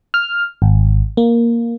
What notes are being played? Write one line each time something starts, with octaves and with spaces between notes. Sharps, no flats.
F6
G#1
A#3